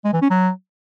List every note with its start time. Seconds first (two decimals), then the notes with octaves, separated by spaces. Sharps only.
0.05 G#3
0.13 E3
0.22 C#4
0.30 F#3